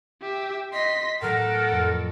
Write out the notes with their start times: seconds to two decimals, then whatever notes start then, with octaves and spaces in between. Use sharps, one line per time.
0.22 G4 E5
0.73 D#5 C6 B6
1.21 A2 F#3 A4 A#4 F#5
1.72 F2